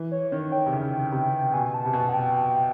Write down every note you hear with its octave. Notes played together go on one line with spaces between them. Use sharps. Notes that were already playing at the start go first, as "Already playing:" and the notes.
Already playing: E3
C#5
D#3 C#5
G5
C3
C#3
C3
B2 G#5
A5
C3
B2 A5
F#5
G5